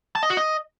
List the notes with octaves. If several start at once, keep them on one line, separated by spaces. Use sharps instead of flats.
A5
D#5
F#4
D#5